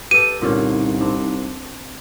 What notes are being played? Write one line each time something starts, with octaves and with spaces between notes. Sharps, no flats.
G4 A4 B4 D#7
C2 A#2 D3 C#4 D#4
C4 D4